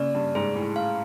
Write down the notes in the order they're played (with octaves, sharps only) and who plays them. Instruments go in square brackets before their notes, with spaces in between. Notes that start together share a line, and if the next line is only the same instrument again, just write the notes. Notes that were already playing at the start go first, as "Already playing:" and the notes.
Already playing: [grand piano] C#3 [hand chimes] A#3 D5
[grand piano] G2
[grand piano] G#2 [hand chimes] G#4
[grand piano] A2
[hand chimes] F5